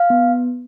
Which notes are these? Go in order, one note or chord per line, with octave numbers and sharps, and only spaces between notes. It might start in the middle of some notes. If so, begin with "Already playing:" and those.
Already playing: F5
B3